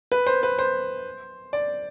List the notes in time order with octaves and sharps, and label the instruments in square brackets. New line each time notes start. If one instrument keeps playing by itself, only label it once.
[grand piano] B4
C5
B4
C5
D5